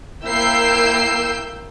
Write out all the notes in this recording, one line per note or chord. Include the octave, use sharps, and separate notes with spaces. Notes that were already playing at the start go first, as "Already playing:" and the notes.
A#3 E4 G5 E6 G6 C7